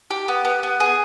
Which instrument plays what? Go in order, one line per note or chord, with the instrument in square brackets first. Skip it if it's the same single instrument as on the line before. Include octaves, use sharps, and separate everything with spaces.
[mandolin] G4
B3
B3
B3
G#4